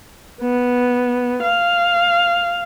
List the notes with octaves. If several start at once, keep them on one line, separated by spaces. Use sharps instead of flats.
B3
F5